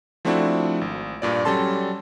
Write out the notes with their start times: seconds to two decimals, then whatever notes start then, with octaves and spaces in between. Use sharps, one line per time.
0.25 F3 A3 C4 D4 E4 F#4
0.81 G#1
1.22 G2 A#2 D5
1.45 F#3 G3 C#4 A4 A5 C6